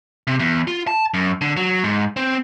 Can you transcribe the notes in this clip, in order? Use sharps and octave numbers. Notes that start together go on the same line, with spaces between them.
C3
E2
F4
A5
F#2
D3
F#3
G#2
C4